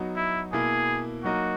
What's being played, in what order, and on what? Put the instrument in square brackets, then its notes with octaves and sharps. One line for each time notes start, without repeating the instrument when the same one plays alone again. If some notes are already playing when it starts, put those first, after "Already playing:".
Already playing: [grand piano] F#3 B3 D#4 F#4
[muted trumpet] E4
[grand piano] B2 A#3 E4 [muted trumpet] G#4
[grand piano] F#3 A#3 D#4 A#4 D#5 [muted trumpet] F#4